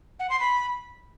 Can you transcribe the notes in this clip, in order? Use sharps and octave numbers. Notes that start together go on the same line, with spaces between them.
F#5
C6
B5